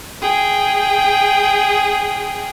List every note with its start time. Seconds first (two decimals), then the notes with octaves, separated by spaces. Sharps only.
0.21 G#4 G5